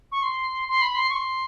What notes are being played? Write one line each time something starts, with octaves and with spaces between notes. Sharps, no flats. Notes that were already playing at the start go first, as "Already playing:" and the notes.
C#6
C6
C6
B5
C6
C#6
C6